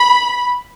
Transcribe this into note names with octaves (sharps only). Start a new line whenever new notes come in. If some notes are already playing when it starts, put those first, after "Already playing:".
Already playing: B5